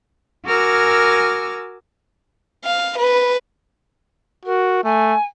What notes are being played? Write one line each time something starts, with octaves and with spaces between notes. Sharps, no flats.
F#4 A#4 G#5 D6 E6 F6
F5
B4
F#4 A#4
A3 G#5